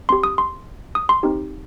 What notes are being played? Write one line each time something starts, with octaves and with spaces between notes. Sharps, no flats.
C4 G4 C6
D#6
C6
D#6
C6
C4 D#4 G4